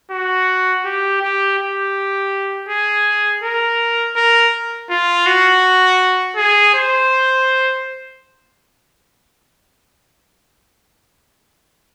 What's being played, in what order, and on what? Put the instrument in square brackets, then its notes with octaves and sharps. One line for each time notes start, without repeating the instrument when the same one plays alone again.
[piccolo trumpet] F#4
G4
G4
G4
G#4
A#4
A#4
F4
F#4
G#4
C5